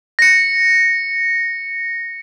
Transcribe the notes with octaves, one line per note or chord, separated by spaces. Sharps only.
A#6 C#7